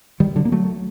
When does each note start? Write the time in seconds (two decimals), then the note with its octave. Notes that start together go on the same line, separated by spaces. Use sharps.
0.20 D#3 G3
0.36 D3 F#3
0.45 A#3
0.52 F#3 A3